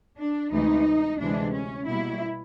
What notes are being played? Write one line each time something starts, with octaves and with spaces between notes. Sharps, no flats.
D4
D2 C3 E3 G#3 D#4
D2 C3 E3 G#3 D4
C#4
B2 G3 A#3 E4